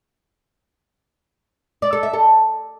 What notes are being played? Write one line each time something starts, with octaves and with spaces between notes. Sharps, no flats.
D5
A4
E5
A4